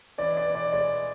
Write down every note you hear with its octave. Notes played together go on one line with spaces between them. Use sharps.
E3 D5
D5
E3
D5
G#3 D5